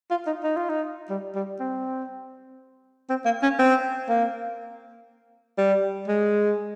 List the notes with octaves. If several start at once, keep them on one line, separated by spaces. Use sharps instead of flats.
F4
D#4
D#4
F4
D#4
G3
G3
C4
C4
A#3
C#4
C4
A#3
G3
G#3